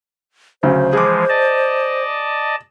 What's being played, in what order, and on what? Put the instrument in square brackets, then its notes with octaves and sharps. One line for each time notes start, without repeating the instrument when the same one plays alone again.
[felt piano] D2 C#3 F#3 [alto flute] C5
[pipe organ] E3 F3 G#3 [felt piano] G#4 D6
[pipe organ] D5 D#5 A5